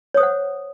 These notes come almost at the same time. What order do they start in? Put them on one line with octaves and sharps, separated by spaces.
C#5 D#6 C5 F#5